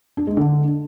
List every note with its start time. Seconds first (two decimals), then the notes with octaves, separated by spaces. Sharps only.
0.17 D4
0.27 G#3
0.37 D3